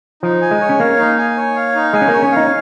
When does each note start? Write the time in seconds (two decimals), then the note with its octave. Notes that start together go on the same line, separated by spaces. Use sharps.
0.23 F3 D#4
0.42 G#5
0.51 G#3
0.61 C#5
0.69 C#4
0.79 A#3 F5
0.99 D#4
1.17 G#5
1.37 C#5
1.56 F5
1.75 D#4
1.93 G#3 G#5
2.01 C#4
2.08 A#3
2.13 C#5
2.22 C#4
2.32 D#4 F5